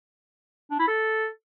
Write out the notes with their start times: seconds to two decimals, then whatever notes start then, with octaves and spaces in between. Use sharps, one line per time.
0.71 D4
0.79 E4
0.88 A4